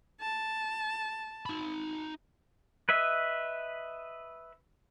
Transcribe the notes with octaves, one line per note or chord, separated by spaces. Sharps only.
A5
D#4 B5
B4 D#5 E5